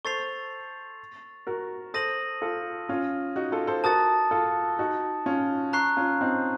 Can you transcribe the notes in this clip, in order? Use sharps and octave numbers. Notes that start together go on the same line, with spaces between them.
A4 C5 C#6 A6 C7 F7
F#4 A#4
A4 C5 D#6 A#6 D#7 F#7
F4 A4
C#4 F4
D#4 F#4
F4 A4
A4 C5
F#4 A#4 A5 D#6 A6
F4 A4
D#4 F#4
C#4 F4
A#5 C#6 F#6 C7
C#4 F4
C4 D#4